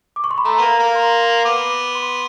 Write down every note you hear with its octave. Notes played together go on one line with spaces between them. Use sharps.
D6
C#6
C6
B5
A3 A#5
A#3 B3 A#5
A#3
C6
B3 D6
C6